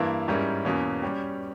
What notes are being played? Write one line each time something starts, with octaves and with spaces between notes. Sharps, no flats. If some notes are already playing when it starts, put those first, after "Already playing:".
Already playing: G2 E3 A#3 E4
G#2 G3 C#4 E4 A#4
E2 B2 A#3 C#4
G3 C#4 G4 C#5